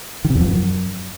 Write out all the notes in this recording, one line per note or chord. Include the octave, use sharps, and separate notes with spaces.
D#3
C3
E2
F3
F#2